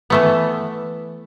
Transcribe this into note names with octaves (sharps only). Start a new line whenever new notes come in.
E3 A3 B3